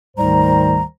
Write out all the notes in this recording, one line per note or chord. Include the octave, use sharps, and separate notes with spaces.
D2 G#2 D#3 G3 C5 A#5